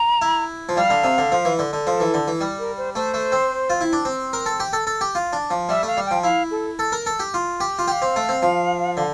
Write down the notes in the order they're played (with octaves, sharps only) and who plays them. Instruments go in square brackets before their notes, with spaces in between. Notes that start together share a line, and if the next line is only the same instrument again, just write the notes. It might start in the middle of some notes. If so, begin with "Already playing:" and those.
Already playing: [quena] A#5
[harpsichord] E4
F3
[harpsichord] G3 [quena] F5
[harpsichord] D3
C3
D3
F3
E3
D3
D3
[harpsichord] F3 [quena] A4
[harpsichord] E3
D3
E3
G3
[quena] A#4
C5
[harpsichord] A3 [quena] C5
[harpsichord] A3
C4
F4
E4
D4
C4
A#4
A4
G4
A4
A4
G4
F4
D4
F3
[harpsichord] G3 [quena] E5
[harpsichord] A3 [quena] F5
[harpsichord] G3
[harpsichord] F3 [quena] G5
[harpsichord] E4 [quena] F5
[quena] A4
[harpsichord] A4
A#4
A4
G4
F4
G4
F4
[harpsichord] G4 [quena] G5
[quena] F5
[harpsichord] C4
A3
C4
F3
D3